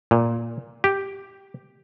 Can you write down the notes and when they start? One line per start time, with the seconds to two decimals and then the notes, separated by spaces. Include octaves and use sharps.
0.11 A#2
0.84 G4